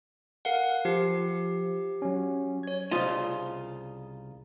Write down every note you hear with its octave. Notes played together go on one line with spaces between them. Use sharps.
A#4 F5 F#5
F3 G4 C7
F#3 C#4
C#5 G#6
C2 C#3 F4 D#5